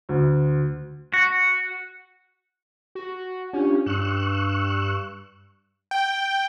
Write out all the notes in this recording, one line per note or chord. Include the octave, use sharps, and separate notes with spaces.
D2
F#4
F#4
C#4 D4 F4 G4
G2 C#6 E6 F#6
G5